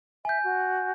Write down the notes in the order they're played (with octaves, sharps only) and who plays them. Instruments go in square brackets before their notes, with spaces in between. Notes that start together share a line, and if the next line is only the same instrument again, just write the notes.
[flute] E5 [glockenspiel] G#5 G6
[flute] F#4